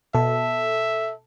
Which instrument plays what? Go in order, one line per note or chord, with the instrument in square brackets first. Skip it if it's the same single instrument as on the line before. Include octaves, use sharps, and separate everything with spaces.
[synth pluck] B2 [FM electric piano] A4 [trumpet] E5